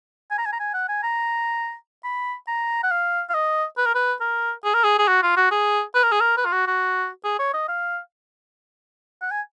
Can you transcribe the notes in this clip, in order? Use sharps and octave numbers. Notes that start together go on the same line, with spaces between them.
G#5
A#5
G#5
A#5
G#5
F#5
G#5
A#5
B5
A#5
F#5
F5
F5
D#5
B4
A#4
B4
A#4
G#4
A#4
G#4
G#4
F#4
F4
F#4
G#4
B4
A#4
G#4
A#4
B4
F4
F#4
F#4
G#4
C#5
D#5
F5
F#5
G#5